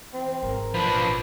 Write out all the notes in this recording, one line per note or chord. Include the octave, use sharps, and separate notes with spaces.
E3 C4
G#1 A#4
F3 D4 B4 B5